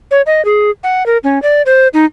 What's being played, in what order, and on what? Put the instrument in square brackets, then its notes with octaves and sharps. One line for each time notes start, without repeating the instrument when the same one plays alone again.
[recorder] C#5
D#5
G#4
F#5
A#4
C#4
D5
C5
D#4